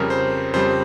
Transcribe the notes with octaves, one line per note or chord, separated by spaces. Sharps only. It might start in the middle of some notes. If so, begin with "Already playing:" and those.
Already playing: F2 C#3 G3 A#4
C5
F2 C#3 G3 C5